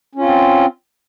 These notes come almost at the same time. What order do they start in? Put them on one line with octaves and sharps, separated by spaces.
C#4 F4 C4